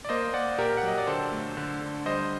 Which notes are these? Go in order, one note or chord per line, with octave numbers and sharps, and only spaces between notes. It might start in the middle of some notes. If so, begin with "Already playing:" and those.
D5
A#3 C5 D#5
A#3 D5 F#5
A#2 G4 A#4
F#5
F#3 D#5
D5
D3 A4 C5
A3
D3
D3
G3 C5 D#5